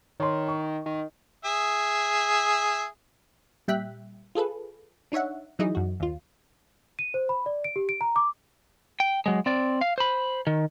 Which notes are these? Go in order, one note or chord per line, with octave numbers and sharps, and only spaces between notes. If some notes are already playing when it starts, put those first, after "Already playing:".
D#3 C#5 C6
C#6
D#3
G#4 E5
A#2 G3 E5 G5 F#6 B6
F4 G#4 A4 B4
D4 D#4 C#5 E5 F#5
E3 F#3 D#4 E4 G#4 D#5
F#2 F#4
D#2 F4
D#7
C5
B5
D5
D7
G4
D7
A#5
D6
G5
F#3 G#3
C4 D5
F5
C5 B5
D#3